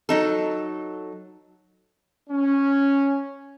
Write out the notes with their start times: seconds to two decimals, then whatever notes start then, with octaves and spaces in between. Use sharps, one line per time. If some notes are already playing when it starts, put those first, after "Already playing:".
0.09 F#3 D#4 A4
2.30 C#4